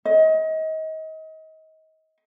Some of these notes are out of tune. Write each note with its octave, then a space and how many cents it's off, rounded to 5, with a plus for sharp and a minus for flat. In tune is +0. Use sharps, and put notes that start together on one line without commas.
D#5 +30